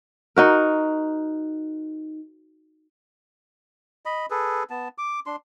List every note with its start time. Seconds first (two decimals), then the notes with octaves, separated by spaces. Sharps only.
0.36 D#4 F#4 A#4
4.06 D#5 B5
4.30 G#4 A4 B4
4.70 B3 A5
4.98 D6
5.26 D4 C6